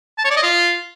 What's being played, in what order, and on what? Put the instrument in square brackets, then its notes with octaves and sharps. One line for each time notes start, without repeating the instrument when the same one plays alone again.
[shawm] A5
C#5
D5
D#5
F4